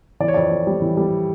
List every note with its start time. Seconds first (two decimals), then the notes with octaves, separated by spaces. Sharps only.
0.20 E3 D5
0.28 C#5
0.34 F2 D5
0.52 F2
0.67 G3
0.82 E3
0.97 G3